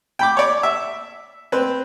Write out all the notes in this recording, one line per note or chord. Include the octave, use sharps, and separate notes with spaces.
G5 B5 D6
C#5 D5
E5
C4 B4